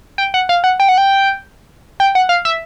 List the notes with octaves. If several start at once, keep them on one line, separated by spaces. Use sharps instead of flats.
G5
F#5
F5
F#5
G5
F#5
G5
G5
F#5
F5
E5